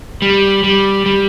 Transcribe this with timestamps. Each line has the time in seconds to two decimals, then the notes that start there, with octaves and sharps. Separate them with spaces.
0.22 G3
0.64 G3
1.06 G3